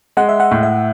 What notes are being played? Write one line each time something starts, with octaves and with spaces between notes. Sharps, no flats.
G#3 F#5
E5
F#5
A2
E5